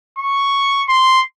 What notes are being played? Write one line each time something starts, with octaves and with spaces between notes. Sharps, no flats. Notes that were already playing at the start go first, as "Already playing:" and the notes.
C#6
C6